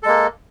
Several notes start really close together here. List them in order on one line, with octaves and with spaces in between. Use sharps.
A4 G#3 A#3